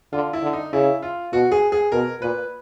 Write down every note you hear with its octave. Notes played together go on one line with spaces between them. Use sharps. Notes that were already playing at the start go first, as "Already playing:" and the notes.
D3 F4
E4
D3
D#4
C#3 E4
F4
B2 F#4
G#4
G#4
B2 A#4
A#2 B4